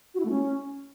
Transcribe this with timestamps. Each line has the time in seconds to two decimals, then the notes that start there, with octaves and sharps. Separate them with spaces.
0.15 F#4
0.20 E4
0.25 A3
0.30 C#4